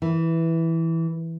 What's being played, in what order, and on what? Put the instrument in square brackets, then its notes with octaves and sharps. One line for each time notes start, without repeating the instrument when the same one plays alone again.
[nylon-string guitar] E3